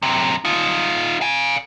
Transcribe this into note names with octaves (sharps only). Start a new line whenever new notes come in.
F#2 C3
D#4 F4
F5 G#5